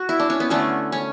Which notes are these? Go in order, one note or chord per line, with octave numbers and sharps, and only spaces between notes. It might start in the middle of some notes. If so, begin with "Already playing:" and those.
Already playing: F#4
E4
D4
C#4
B3
D3 A3 C#4
C#4